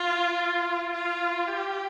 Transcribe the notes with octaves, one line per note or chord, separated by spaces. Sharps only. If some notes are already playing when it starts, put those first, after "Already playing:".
Already playing: F4
F4
G4